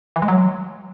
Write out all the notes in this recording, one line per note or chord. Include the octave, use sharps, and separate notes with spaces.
E3
G#3
F#3